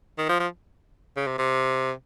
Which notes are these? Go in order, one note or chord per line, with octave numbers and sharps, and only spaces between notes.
D#3
F3
F3
C#3
C3
C3